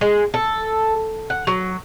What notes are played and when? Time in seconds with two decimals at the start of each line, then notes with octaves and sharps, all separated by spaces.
0.01 G#3
0.34 A4
1.30 F#5
1.47 F#3